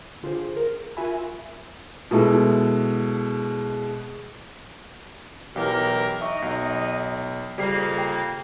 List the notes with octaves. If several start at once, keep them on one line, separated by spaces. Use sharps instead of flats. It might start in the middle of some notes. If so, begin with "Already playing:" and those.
D3 F4 G4 G#4 C5
A#4
F4 F#4 A#4 E5 G#5 B5
B2 G#3 E4 A4
B1 E3 G4 A#4
D#4 D#5 E5 C#6
B1
F2 C#3 G3 A#3 G4 C7
G5